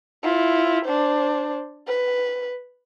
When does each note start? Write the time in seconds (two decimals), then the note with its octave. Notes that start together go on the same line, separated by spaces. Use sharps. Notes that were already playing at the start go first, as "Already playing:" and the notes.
0.23 E4 F4
0.85 D4 C5
1.87 B4